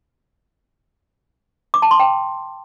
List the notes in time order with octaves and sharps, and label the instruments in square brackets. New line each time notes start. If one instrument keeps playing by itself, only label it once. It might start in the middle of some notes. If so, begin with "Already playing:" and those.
[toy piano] D6
A5
C6
G5